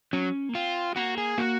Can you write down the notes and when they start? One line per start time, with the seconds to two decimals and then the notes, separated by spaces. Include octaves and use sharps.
0.13 F#3 C#4
0.49 A#3
0.54 C4 F4
0.92 G#3
0.96 A#3 F#4
1.18 G#4
1.38 A#3 F#4